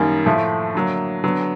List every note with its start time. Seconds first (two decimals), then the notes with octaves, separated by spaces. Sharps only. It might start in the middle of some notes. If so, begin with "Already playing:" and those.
Already playing: F#2 D#3 G3 A#3
0.26 A2 F3 A3
0.75 D3 F#3 A#3
1.24 D3 F#3 B3